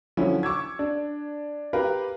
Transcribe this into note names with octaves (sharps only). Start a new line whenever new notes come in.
D3 F3 F#3 C#4 E4
C#6 D6 E6 G#6
D4
G4 A#4 B4 F5